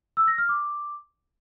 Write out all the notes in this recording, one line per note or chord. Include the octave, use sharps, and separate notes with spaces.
E6
A#6
F6
D6